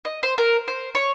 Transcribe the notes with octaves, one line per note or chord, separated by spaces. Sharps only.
D#5
C5
A#4
C5
C#5